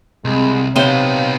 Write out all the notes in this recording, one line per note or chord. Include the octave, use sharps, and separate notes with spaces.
C2 G#3 C4
C3 B3 D#4 C5 C#5 F5